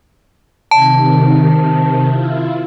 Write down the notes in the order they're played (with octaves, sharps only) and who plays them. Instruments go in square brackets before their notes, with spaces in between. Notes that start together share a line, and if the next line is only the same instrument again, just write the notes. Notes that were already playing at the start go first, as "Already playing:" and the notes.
[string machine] C3 D#3 [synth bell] A5
[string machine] E4 F4